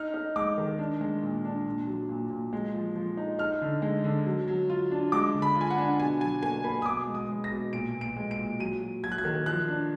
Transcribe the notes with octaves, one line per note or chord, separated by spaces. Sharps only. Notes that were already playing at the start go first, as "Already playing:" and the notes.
Already playing: D#4 F6
D#4
G#3 D6
D#3
D4
G#3
A#2
D4
A#2
F#3
A#2
A#2
G#3
F3
F3
D#4
D#4 F6
D3
G#3
D3
F#3
F#3
F4
D4
G#3 D6
D3
B5
F4
G#5
F#5
D4
B2 G#5
F#3 G#5
A#3 G#5
A#3 B5
D#6
B2 D6
G#3
D#6
G#3
A#6
B2
A#2 D7
A#2
D7
G#3
D7
A#2
F#3 D#7
F#3
F#3 G#6
F#6
G#6
D#3
F3 F#6
D4